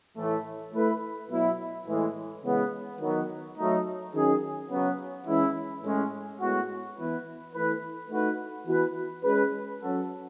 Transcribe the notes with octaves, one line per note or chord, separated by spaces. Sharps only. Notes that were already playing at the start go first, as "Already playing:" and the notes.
A2 E3 A3
A3 E4 B4
B2 F#3 B3 E4
A2 E3 G#3
C#3 E3 G#3 B3
D#3 F#3 B3
F#3 A3 D#4
D#3 F#3 C#4 G#4
C#3 F#3 B3
E3 G#3 C#4 E4
A2 G#3 C#4
A2 G#3 B3 F#4
E3 B3 E4 B4
E3 A3 E4 B4
A3 D#4 F#4 B4
E3 B3 F#4 B4
G#3 C#4 G#4 B4
F#3 C#4 F#4 A4